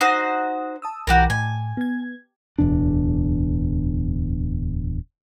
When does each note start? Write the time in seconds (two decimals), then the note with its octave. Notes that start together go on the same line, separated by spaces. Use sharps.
0.01 D#4 F#4 C5
0.82 A5 D#6 E6
1.07 B1 E3 F#4 G4 A#4
1.30 A2 G#5
1.77 B3 G#6
2.58 D1 E2 B2 D4